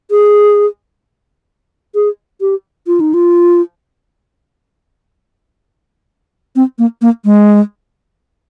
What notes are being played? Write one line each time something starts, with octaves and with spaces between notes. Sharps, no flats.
G#4
G#4
G4
F4
D#4
F4
C4
A#3
A#3
G#3